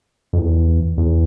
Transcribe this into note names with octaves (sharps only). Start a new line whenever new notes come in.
F2
E2
E2